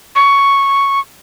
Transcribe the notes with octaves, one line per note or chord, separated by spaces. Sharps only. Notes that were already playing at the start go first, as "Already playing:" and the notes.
C#6